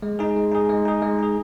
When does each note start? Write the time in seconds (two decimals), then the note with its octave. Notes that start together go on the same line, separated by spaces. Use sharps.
0.02 G#3
0.19 D#4 G#4
0.36 G#3
0.52 D#4 G#4
0.69 G#3
0.85 D#4 G#4
1.02 G#3
1.19 D#4 G#4